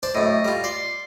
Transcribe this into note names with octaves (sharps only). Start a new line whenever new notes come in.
D4 C5 A5
F#2 A2 D#5
G3 F4
D5 C6